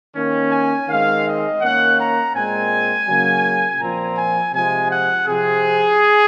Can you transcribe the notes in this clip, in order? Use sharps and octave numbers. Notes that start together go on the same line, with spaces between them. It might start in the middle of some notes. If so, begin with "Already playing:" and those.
D#3 A#3 C#4
G#5
D#3 G#3 C4 F5
D#5
D#3 A#3 C#4 F#5
A#5
A#2 G#3 C4 G#5
C#3 F#3 A#3 C#4
A#2 F3 C4 A#5
G#5
C3 F3 G#3 G#5
F#5
C3 F3 C4 G#4